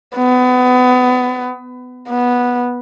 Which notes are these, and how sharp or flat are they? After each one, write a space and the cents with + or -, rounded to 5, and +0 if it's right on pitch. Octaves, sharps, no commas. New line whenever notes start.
B3 +25
B3 -10